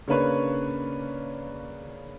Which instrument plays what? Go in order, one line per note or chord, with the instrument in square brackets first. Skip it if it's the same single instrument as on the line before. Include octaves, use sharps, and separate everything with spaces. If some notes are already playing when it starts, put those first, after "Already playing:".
[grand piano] C#3 A#3 C#4 D4 B4 C#5